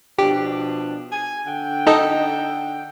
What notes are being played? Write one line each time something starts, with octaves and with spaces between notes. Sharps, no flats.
B2 F3 D4 G4
G#5
D3 F#5 G5
D#4 A4 D#5